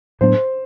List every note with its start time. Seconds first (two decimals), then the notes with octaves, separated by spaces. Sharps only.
0.21 A2 F#3 B3 D4 C5